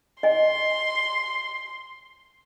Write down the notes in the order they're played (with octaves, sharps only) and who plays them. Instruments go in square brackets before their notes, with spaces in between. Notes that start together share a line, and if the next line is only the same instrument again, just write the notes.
[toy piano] D#5 G#5 [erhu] C6